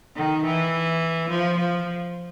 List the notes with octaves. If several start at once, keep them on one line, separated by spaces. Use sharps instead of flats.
D#3
E3
F3
F3